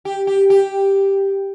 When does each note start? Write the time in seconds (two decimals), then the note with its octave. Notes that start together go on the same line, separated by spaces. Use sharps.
0.05 G4
0.27 G4
0.50 G4